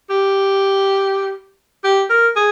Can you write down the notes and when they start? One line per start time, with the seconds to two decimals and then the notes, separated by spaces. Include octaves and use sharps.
0.10 G4
1.84 G4
2.10 A#4
2.36 G#4